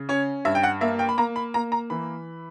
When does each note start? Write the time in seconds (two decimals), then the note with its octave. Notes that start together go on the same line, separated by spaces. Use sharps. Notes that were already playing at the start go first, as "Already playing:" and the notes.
Already playing: C#3
0.09 C#4 C#5
0.45 G2 E5
0.55 G5
0.64 F#5
0.81 A#3 E5
0.99 G5
1.09 B5
1.18 A#3 A#5
1.36 B5
1.54 A#3 A#5
1.72 A#5
1.90 E3 B5